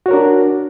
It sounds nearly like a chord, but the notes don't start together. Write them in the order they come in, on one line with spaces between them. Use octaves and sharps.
F#4 C#5 A#4 D4